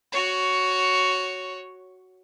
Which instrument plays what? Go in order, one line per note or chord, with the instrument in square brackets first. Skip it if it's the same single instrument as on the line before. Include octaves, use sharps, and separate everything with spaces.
[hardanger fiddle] F#4 C#5